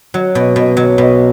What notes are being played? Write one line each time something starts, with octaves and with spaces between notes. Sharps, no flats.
F#3
B2
B2
F#3
B2